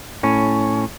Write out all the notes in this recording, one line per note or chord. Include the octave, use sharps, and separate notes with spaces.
A2 C#4